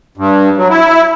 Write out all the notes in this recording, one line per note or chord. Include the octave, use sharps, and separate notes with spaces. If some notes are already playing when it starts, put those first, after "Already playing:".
G2
F#3
E4